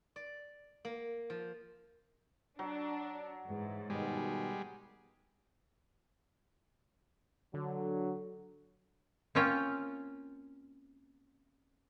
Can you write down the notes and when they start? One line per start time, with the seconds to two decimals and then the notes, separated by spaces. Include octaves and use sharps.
0.16 D5
0.85 A#3
1.30 F3
2.59 F#3 D4
3.49 G#2 E3 G#3
3.90 B2 D#3 G3 G#3
7.54 D3 F#3
9.35 A#3 C4 C#4 F4 C#5 G5